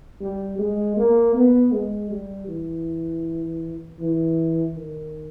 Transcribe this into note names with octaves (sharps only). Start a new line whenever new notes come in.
G3
G#3
A#3
B3
G#3
G3
E3
E3
D#3